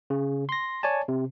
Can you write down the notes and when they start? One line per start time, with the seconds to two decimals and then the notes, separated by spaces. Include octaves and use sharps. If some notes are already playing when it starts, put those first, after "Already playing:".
0.10 C#3
0.49 C6 A#6
0.83 C#5 D5 G#5 A5
1.08 C3